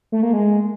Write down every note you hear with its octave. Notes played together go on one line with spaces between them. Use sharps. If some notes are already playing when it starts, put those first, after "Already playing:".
A3
A#3
G#3